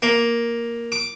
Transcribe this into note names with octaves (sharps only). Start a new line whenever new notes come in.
A#3
D6